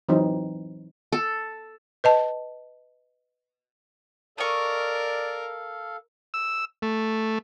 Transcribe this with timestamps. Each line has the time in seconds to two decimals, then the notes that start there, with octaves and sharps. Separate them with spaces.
0.09 E3 F#3 C4 D#4
1.12 A4
2.04 B4 D#5 A5
4.38 A4 A#4 D5 D#5 F5 C#6
6.34 E6
6.82 A3